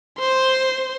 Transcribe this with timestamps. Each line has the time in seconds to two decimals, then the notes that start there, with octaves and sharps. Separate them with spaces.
0.20 C5 C6